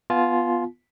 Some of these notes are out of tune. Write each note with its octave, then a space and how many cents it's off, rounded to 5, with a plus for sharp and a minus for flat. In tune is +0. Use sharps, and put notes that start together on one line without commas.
B3 +0 F4 +0 G#5 +45